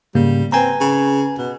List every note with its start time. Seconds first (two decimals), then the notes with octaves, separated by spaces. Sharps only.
0.15 G#2 C#3 G3 A#3
0.52 C4 B4 G#5 A#5
0.81 C#3
1.38 B2